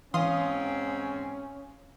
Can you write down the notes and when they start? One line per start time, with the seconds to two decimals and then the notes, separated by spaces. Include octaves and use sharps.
0.14 G#2 E3 C4 C#4 F5 C6 D#6